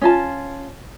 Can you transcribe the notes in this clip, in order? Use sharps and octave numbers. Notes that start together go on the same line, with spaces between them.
C#4 F4 A5